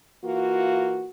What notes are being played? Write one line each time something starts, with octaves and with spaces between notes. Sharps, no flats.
E3 A#3 F4 F#4